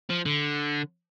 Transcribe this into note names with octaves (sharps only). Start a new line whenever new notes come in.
F3
D3